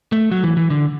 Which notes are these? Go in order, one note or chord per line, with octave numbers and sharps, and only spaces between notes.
A3
F#3
E3
E3
D3